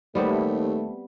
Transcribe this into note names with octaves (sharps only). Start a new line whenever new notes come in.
D#2 G3 A3 B3 C4